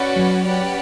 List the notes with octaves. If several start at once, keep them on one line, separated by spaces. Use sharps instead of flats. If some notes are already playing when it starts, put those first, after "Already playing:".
Already playing: C#4 F#4 B4 D5
F#3
C#4 G4 B4 D5 F#5